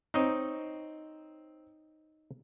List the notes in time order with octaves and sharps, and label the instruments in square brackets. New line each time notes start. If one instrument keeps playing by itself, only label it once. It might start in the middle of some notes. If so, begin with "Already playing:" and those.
[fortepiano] C4 [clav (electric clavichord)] D#4 C#5 D#5